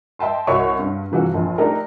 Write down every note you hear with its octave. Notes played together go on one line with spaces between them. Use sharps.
D#5 E5 G5 A5 C6
C2 F#4 C#5 D#5 E5 C#6
G2
G2 C3 E3 F3 G3 F#4
A#1 F2
A3 D4 D#4 G4 A#4